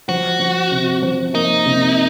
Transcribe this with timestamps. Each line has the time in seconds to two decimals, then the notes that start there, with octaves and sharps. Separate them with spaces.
0.09 F3 F#4
0.40 F3
0.71 C3
1.02 F3
1.34 A#3 D#4
1.66 C3